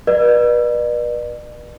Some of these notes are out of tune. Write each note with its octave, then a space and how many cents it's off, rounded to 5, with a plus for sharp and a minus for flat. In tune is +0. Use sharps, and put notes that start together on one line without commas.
B4 -35 D5 +40